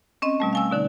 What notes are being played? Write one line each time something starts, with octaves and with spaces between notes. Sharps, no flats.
C4 C#4 D#5
B2 G3 A3
F5 G#5 E6
B2 D3 D#4